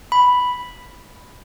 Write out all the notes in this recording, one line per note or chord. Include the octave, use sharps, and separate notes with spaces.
B5